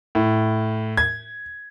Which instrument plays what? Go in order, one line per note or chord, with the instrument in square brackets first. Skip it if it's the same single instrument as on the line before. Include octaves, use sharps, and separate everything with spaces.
[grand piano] A2
G#6